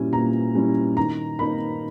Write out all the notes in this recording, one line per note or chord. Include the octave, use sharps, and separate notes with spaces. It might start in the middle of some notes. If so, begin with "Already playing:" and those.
Already playing: A#2 G3 C#4 E4 G#5
A#2 A#5
G3 C#4 E4
D#3 A#5
A#3 D#4 B5